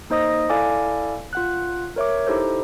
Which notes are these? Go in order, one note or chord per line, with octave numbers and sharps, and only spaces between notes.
A#3 D#4 C5 D#5 D#6 A#6
E4 A4 D5 F5 G#5 D6
F4 F#5 F#6
A#4 C#5 E5 D6
D#4 E4 G4 A4 C5